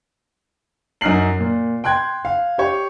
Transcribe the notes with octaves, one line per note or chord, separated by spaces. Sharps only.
F#2 D#4 F6 F#6 C7 F#7
A#2
G5 C6 F#6 G#6
F5
G4 C#5